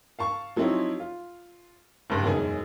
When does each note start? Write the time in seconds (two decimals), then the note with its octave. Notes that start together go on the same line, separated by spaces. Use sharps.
0.19 F5 A5 C#6
0.56 F3 F#3 C4 D#4 E4 C#5
1.00 F4
2.10 F#1 G2
2.24 E1 F#2 B3 D#4 G#4 G#5